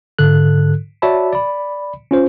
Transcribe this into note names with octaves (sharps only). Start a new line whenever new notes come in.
G#2 D3 A4 F#6
F#4 C#5 D5 E5 A5 B5
D5 B5
C#4 F4 C5